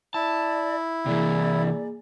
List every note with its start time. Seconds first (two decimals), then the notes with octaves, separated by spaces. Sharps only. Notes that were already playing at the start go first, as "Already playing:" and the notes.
0.14 E4 D5 A5
1.06 C3 E3 A#3 G#4 D5 G#5